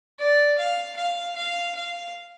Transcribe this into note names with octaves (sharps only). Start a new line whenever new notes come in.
D5
F5
F5
F5
F5